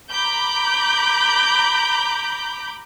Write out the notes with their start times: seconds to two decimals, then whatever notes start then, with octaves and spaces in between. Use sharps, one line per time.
0.12 A#5 B5 D6 G6